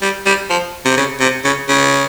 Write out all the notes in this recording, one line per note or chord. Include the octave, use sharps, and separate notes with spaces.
G3
G3
F3
C3
C#3
C3
C#3
C#3